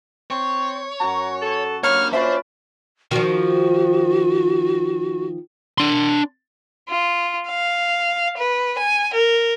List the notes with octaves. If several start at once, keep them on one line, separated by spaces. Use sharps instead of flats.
C4 C#5
F#2 F#4 A#5
A4
A#3 D4 C#5 B5 F6
C#4 D4 F4 B4 C5 D5 E5
D#3 F3 F#4
D4 C6
F4
F5
B4
G#5
A#4